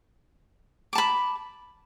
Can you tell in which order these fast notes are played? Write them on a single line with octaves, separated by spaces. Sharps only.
D6 A5 B5